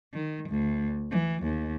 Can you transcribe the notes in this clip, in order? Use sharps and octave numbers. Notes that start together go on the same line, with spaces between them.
D#3
D2
E3
D#2